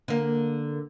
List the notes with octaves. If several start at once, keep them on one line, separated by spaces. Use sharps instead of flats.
D3 A#3